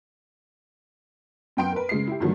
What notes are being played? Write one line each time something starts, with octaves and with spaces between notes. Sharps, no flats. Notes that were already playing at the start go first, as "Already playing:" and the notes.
F#2 B3 G5 C6 D7
A#4 B4
C#3 G#3 C7
E4 G4
G2 D3 D#3 F3 F#3 A3